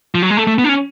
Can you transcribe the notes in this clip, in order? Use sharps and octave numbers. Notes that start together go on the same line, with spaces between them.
F3
F#3
G#3
A3
A3
B3
D4
C#4